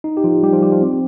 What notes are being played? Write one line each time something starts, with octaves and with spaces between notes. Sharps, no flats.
D#4
G4
F3 F4
G3 G4
F3 F4
G3 G4
F3 F4
C4